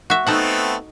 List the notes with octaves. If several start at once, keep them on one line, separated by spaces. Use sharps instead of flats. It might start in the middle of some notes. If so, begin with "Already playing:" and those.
F#4 E5
A3 B3 C4 D#4 A4 F#5